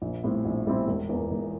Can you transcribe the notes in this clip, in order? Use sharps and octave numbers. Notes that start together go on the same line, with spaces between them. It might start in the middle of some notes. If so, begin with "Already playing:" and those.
A#1
A2 G3 C4 E4
A#1
A2 G3 C4 E4
E1
E2 E3 A#3
E1